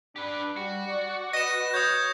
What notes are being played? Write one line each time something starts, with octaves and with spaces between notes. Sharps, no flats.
D4 G4 B4
G3 F#4
D5
B4 D#5 A#6 E7
C#5 D#6 G6